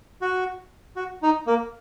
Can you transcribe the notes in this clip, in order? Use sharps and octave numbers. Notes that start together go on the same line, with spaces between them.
F#4
F#4
D#4
A#3